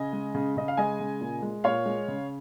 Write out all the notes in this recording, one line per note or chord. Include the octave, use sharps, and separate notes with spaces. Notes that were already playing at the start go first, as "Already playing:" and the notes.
Already playing: C#3 D#5 G#5
G#3
C#3
C#3 D#5
F5
G#3 D#5 G#5
C#3
A#2
G#3
A#2 C#5 F5
G#3
C#3